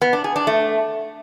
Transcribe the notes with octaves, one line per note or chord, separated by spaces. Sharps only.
B3
D4
G#4
D4
A3